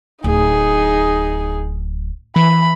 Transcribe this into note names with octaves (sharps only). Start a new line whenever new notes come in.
D1 D#4 G#4
E3 B5